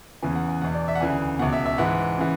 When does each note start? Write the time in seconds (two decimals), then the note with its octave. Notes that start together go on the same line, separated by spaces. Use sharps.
0.22 E2 C#3 E3 G#5
0.36 F#5
0.49 G#5
0.62 E2 B2 F#5
0.75 D5
0.88 E5
0.95 F#5
1.01 D2 C#3 E3 G#5
1.39 B2 F#5
1.42 C#2
1.53 E5
1.66 E5
1.78 G#2 E3 F#5
2.19 C#3 E3